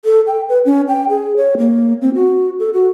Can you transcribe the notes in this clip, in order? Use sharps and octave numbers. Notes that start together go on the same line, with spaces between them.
A4
G5
B4
C#4
G5
G#4
C#5
A#3
C4
F#4
A4
F#4